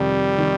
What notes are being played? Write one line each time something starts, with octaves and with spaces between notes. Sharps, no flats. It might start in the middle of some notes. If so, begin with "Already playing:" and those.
Already playing: F2 C3 D#3 G3
C3 D#3